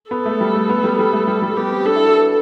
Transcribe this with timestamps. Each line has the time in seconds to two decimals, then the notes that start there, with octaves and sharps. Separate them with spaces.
0.11 B3 A4
0.26 A3
0.41 G3
0.55 A3
0.70 B3
0.84 G3
0.99 G3 A4
1.13 A3
1.28 G3
1.42 G3
1.57 B3 G4
1.72 C4
1.85 D4 A4
1.96 E4
2.05 F#4
2.15 B4